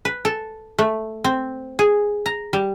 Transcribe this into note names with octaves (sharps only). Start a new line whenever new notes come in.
B4
A4
A3
C4
G#4
A#5
G3